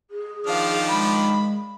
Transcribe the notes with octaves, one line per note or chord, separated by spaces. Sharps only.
G#4
D#3 F3 D4 F5
G#3 B5